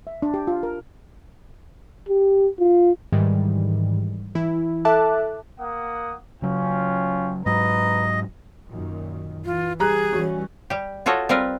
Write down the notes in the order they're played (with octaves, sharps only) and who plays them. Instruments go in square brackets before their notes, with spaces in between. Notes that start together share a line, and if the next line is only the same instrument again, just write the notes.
[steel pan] E5
D4
G4
F4
A#4
[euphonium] G4
F4
[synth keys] G#2 D#3 E3 G3
E3 E4
A4 E5 A5 D6 F#6
[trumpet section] A#3 F#5 D#6
[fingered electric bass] C#3 F#3 [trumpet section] C#4 F4 G5
[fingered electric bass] G#2 F#3 [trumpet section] B4 A#5 [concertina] D#5
[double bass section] F#2 A#2 D#3
[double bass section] E3 [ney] F4
[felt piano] G3 A#5 F#6 [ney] G#4
[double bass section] E3 G3 C#4 [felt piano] F#4
[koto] G3 G4
F4 F#4 A4 C#5 D#5
G3 C4 F4 A#4 B4